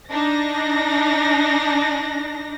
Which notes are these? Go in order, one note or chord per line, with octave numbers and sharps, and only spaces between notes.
D4 D#4 A#6